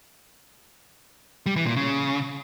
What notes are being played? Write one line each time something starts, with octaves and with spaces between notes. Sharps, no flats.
G3
E3
A#2
C#3